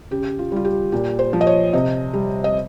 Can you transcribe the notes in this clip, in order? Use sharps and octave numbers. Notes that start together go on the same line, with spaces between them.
C#3 G4
F4
G3 F4
G4
A#2 G4
C5
F3
D#5
C#5
C3 D#5
G3
D#5